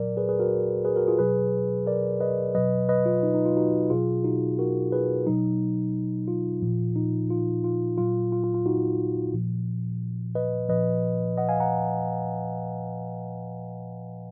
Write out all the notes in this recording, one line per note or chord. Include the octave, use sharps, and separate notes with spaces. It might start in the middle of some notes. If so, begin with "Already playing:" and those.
Already playing: A#2 F#3 A#4 D5
G#4 B4
G#4 B4
F#4 A#4
G#4 B4
F#4 A#4
F4 G#4
B2 F#3 G#4 B4
A#4 D5
B4 D#5
B2 F#3 B4 D#5
B4 D#5
F4
D#4
D#4
F4
D#4 F#4
B2 F#3 F4 G#4
D#4 F#4
F#4 A#4
G#4 B4
B2 F#3 D#4
F4
A#2 F3
D#4
F4
F4
A#2 F#3 F4
F4
F4
F4
D#4 F#4
A#2 F3
B4 D#5
A#2 F3 B4 D#5
D#5 F#5
F5 G#5
F#5 A#5